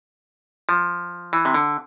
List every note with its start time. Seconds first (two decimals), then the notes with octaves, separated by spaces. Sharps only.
0.69 F3
1.33 E3
1.45 C3
1.54 D3